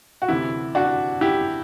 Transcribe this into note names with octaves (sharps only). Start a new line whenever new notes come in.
F#4
D2 C3 E3 E4
D4 F#4
E4 G4